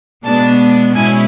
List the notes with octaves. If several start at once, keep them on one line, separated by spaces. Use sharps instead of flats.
B2 G#3 B3 D4 A5
B2 G#3 C#4 E4 G#5